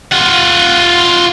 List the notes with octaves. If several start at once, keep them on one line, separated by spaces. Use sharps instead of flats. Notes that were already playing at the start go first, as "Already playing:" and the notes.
F4 F#5